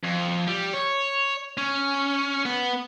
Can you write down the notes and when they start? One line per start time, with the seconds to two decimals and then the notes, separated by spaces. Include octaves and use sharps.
0.04 F2
0.47 G3
0.73 C#5
1.58 C#4
2.46 B3